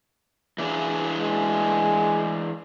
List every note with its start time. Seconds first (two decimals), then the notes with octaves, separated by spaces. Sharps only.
0.58 E3 D4 G#4
1.20 G#3